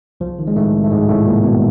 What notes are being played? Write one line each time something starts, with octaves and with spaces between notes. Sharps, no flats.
C2 F3
D#3
G#3
A2 D#3 A3
C2
A3
C2 G#2 G#3
C2 A2 A3
C2 A#2 A#3
B2 D#3 B3